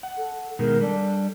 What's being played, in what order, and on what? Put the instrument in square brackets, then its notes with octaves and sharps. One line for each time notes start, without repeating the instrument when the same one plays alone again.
[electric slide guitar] F#5
[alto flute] A4
[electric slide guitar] B2 D#3 G#3 [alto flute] A#4
[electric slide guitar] G3 A4 [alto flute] D4